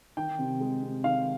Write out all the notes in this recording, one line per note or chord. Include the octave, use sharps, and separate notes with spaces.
D#3 G5
C3
G#3
C3
D#3 F5